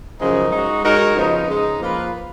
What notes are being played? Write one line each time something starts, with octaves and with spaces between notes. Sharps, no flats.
F#2 C#3 F3 G#3 D#4
G#3 D#4 F#4
G#3 D#4 F#4 A#4 C#5
C#3 F3 B3 D#4
C#3 G#3 D#4
F3 A#3 F4 B4